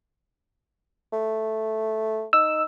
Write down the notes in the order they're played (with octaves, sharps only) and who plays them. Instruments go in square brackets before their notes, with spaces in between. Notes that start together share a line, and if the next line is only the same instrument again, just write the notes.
[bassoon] A3
[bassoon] D#4 [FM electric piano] E6